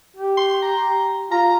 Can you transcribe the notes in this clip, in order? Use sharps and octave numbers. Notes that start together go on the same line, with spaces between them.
G4
C6
A#5
F4 A#5